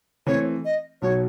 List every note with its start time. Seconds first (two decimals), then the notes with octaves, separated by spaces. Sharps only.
0.27 E3 A3 C4 C#5
0.65 D#5
1.02 B1 B2 F#3 C#5